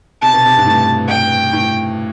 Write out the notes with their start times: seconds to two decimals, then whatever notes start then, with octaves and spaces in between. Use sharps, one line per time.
0.22 C3 A5
0.33 B2
0.46 C3
0.57 G2
0.66 A2
1.09 G5
1.53 A2